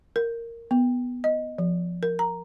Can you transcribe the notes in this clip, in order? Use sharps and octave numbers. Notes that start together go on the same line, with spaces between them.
A#4
B3
D#5
F3
A#4
A#5